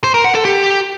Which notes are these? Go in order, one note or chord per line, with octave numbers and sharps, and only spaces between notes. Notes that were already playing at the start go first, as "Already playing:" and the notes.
C5
A#4
F#5
A4
G4